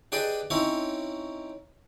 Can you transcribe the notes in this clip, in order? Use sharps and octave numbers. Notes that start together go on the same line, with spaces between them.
D4 G4 G#4 B4 D5 D#5
C4 C#4 D#4 E4 C#5